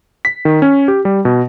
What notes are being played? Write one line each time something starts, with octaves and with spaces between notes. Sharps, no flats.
B6
D#3
C#4
G4
G3
B2